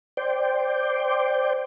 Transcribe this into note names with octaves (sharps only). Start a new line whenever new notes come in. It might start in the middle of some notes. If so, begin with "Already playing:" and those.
C5 D5 G5